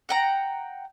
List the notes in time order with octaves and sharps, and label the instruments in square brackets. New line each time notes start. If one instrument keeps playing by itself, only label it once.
[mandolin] F#5 G5 A#5